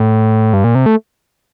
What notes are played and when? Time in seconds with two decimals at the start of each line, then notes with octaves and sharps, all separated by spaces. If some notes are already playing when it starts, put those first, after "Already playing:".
Already playing: A2
0.53 G2
0.64 A#2
0.75 C3
0.86 A3